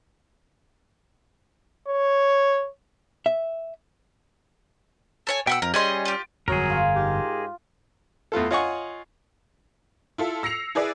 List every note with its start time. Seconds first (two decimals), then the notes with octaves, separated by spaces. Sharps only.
1.88 C#5
3.26 E5
5.27 A4 C#5 G#5
5.47 B2 E5 F#5 G5 E6
5.62 F2 A#4
5.74 G3 C#4 G#4 D#5 C6
6.05 F4 G4
6.48 G1 F2 F#3 G#4 A#4
6.70 F4
6.95 G#2 G4
8.32 E2 A3 F4 A4
8.51 F4 C#5 D#5 F#5 G#5 C#6
10.18 E4 F4 A4
10.43 E6 A#6 C7 C#7 F7
10.75 E4 G#4 B4 D5